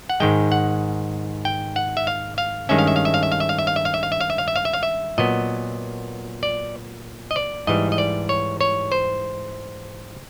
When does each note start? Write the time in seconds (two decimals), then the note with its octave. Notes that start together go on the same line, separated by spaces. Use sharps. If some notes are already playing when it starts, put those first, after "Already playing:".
0.10 F#5
0.20 G#2 D#3 G#3 G5
0.52 F#5
1.45 G5
1.76 F#5
1.97 E5
2.07 F5
2.38 F5
2.69 G2 D#3 G#3 C#4 E5
2.78 F5
2.87 E5
2.96 F5
3.05 E5
3.14 F5
3.23 E5
3.32 F5
3.40 E5
3.49 F5
3.59 E5
3.67 F5
3.76 E5
3.85 F5
3.94 E5
4.03 F5
4.12 E5
4.20 F5
4.30 E5
4.38 F5
4.48 E5
4.56 F5
4.65 E5
4.73 F5
4.83 E5
5.18 A#2 F#3 B3 D#5
6.43 D5
7.31 D#5
7.36 D5
7.67 G#2 E3 G3 D#5
7.92 D#5
7.98 D5
8.29 C#5
8.61 C#5
8.92 C5